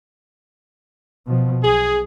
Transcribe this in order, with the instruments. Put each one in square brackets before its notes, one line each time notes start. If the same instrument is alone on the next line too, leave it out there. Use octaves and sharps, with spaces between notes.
[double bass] B2 F3
[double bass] B1 [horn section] G#4